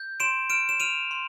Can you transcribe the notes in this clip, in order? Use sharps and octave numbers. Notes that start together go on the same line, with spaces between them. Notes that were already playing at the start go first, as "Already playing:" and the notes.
Already playing: G6
C6 D7 E7
F6 D7 E7
E7
F6 D#7 F7
C6